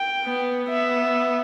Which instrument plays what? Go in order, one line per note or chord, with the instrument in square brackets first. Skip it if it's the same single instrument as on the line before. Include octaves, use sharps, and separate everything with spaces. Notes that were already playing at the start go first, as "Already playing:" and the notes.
Already playing: [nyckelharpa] G5
[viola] B3
[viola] B3 [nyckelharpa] E5